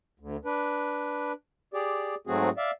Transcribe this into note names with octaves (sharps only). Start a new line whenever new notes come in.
D2
D4 B4
G4 G#4 D5
G#2 F#3 A3 C4 F#4 G#4
D5 E5 F5